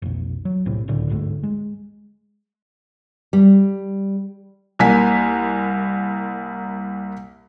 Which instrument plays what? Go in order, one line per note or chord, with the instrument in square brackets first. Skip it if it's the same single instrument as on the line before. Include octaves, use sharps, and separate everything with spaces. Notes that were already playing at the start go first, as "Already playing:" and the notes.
[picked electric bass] F1 B1
F#3
B1 A2 C3
D1 C#2 A2 D3
G1 D2 G#2 A3
G#3
[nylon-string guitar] G3
[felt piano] C2 A#3 G#5 B6